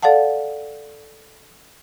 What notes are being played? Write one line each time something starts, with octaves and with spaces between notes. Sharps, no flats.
A4 D5 F5 F#5 A5